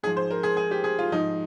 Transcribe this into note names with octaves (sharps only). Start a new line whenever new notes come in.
G#2 F3 G#4
C5
A#4
G#4
G#4
G4
G#4
F4
G#2 F3 D#4